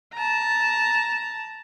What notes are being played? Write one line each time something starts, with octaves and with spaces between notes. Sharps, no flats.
A5 A#5